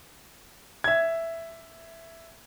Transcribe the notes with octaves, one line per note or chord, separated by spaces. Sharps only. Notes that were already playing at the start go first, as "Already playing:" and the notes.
E5 G#6